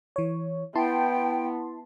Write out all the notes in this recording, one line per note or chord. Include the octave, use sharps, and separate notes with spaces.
E3 C#5
B3 E4 G5 A5 C6